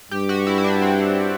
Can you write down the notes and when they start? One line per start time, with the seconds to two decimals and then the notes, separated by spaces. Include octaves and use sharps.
0.11 G2 G4
0.29 F#4
0.47 E4
0.58 E4
0.64 D4
0.82 C4